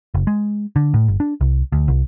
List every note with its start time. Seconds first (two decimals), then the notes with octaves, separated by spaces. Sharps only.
0.14 F#1
0.27 G#3
0.76 D3
0.94 A2
1.08 G1
1.20 D4
1.41 C2
1.72 D2
1.88 C2